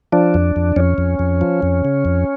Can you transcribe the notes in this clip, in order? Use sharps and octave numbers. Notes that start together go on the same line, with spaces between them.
F3 D4
F2
F2
F2 C#4
F2
F2
F3
F2
C#3
F2